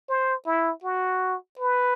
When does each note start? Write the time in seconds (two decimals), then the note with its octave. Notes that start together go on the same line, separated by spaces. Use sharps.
0.09 C5
0.46 E4
0.84 F#4
1.59 B4